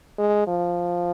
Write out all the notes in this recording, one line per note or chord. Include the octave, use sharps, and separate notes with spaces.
G#3
F3